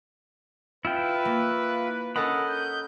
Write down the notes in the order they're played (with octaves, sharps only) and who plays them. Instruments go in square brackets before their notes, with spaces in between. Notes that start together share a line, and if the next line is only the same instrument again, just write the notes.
[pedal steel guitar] E4 F4 G5 [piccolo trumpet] B4
[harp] A#3
[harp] C#4 A4 A#4 [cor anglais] D#5 [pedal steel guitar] F#5 B5
[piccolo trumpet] G6